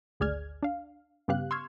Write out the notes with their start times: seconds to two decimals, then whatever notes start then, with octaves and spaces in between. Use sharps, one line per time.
0.20 G#1 D2 G#4 D5 F6 G#6
0.63 D4 F5
1.28 G2 C#3 B3 G4 F5 F#6
1.51 C6 C#6 E6 F6 G#6